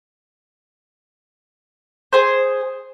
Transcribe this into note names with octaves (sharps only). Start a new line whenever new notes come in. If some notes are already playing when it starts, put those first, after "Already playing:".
G#4 C5